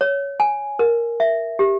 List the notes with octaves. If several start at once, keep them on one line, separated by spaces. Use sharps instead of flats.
C#5
G#5
A#4
E5
G4